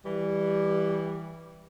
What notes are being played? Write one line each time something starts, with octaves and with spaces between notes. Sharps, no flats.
E3 G3